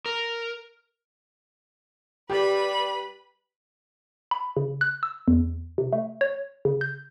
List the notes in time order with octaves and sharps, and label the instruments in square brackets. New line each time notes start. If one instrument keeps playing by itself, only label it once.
[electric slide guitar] A#4
[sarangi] G3 [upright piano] G4 [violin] B4 B5
[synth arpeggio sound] B5
C#3
F#6
E6
E2
C3
A3
C#5
C#3
G6